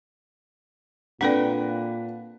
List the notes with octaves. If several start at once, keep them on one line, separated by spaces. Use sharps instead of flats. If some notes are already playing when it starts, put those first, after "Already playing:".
A#2 C4 D4 A4 B4 D5 F#5 G5